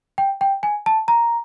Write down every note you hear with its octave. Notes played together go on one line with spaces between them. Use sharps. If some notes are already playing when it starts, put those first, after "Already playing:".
G5
G5
G#5
A5
A#5